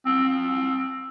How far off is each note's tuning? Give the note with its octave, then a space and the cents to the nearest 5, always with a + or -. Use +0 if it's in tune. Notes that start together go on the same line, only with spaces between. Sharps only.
C4 +20